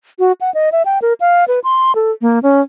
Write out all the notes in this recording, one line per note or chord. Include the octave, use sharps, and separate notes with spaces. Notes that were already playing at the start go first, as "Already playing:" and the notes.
F#4
F#5
D#5
E5
G5
A#4
F5
B4
C6
A4
A#3
C#4